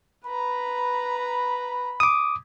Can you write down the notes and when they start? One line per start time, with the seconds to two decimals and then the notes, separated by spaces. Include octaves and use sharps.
0.26 B4 A#5 B5
2.00 D6 D#6